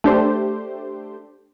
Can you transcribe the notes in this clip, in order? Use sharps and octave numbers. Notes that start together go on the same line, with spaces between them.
A3 D4 G4 C5